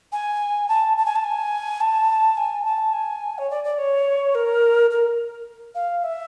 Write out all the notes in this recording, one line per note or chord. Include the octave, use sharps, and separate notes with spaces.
G#5
A5
A5
G#5
A5
G#5
A5
G#5
A5
G#5
C#5
D5
D5
C#5
A#4
A#4
F5
E5